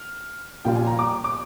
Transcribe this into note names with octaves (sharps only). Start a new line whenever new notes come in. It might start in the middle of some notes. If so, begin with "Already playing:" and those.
Already playing: F6
A#1 A#2 G3 A#3 F4 G5
G#5
A#5
D6
D6